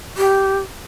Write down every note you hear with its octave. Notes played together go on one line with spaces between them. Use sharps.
G4